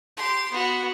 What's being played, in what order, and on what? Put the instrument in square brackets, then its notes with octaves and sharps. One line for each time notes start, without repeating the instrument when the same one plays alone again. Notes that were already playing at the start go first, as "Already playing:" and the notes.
[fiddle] G4 C6
B3 F#4